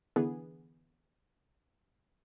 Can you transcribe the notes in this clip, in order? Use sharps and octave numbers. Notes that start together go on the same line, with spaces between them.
D3 E3 B3 G#4